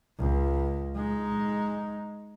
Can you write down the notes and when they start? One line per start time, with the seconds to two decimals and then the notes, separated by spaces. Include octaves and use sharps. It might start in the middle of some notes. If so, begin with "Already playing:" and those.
0.19 C#2
0.96 G#3 D#4